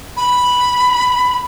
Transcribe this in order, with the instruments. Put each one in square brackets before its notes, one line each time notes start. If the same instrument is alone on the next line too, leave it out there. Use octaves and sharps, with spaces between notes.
[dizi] B5